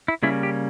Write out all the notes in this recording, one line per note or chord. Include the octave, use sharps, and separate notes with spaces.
E4
C#3 G3 A#3 C#4 E4
G4